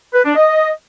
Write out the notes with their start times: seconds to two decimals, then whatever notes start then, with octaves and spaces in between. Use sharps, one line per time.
0.14 B4
0.25 D4
0.36 D#5